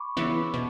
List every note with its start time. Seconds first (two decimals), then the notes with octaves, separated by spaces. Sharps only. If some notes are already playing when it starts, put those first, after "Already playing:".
Already playing: B5 C#6 D6
0.17 C#3 E3 B3 E4
0.54 B2